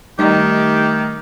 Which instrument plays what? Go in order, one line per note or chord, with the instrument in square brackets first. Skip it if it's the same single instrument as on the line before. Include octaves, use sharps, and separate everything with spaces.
[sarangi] D#3 [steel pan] G3 D#4 [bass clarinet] A3 [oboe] G4